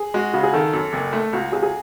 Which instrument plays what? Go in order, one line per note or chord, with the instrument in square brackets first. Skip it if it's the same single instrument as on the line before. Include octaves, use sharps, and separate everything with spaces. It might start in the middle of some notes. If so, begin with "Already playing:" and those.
Already playing: [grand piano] G#4
[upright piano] G#3 [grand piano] F#4
[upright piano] C#3 [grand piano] F#4
[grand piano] G#4
[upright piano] D#3 [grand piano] A4
[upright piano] F#2
F#1
A3
[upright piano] C#2 [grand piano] F#4
[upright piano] C#2 [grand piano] G#4
[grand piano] G#4